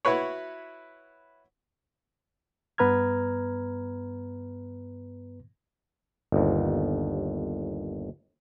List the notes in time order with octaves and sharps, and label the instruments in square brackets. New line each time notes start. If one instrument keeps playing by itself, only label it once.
[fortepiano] E4 F#4 B4 C#5
[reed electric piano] G2 B3 B4 A#5 F6 G#6
[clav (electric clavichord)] G1 D#2